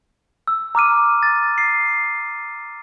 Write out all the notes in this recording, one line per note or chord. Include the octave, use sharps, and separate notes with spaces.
E6
A#5 D6 F6 D#7
A6
C7